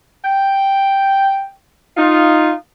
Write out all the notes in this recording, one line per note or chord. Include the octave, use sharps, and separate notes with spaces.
G5
D#4 F4